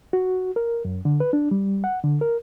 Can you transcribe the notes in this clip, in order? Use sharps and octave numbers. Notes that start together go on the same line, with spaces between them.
F#4
A#4
F#2
D3
B4
D4
G3
F#5
D3
A#4